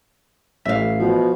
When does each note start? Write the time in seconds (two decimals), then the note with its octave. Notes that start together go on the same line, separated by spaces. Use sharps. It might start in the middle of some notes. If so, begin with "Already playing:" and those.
0.65 A1 E5 F5
0.99 B2 F3